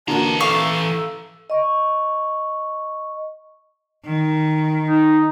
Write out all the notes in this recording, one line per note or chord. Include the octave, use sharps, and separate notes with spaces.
D3 E3 A#3 F#4 A5 A#5
A4 F5 C#6 D6 E6
D#5 C#6
D#3
D#4